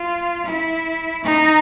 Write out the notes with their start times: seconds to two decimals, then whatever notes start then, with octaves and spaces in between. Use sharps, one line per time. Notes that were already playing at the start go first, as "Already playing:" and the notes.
Already playing: F4
0.45 E4
1.24 D#4